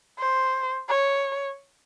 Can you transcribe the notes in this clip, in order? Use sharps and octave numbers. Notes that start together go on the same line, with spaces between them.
C5
C#5